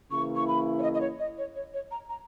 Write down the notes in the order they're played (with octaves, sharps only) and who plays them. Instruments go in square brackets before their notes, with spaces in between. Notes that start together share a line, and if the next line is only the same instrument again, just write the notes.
[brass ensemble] C#3 E3 A#3 E4 [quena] C#6
[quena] C#6
B5
C#5
D#5
D#5
C#5
D#5
C#5
C#5
C#5
A#5
A#5